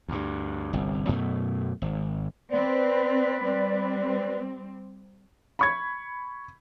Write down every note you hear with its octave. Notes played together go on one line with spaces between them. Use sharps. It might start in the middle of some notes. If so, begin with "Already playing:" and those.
D2 G2
G1 C2
F#2 B2 A3
G#1
C4 B4 D5
G3 C4
B5 C#6 G#6